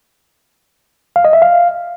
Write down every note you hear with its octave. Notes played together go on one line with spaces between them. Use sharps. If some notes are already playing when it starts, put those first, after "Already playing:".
F5
D#5
E5
F5